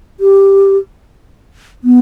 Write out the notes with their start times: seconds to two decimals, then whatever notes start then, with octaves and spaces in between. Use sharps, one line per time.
0.20 G4
1.84 B3